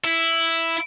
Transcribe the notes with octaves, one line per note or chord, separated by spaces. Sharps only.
E4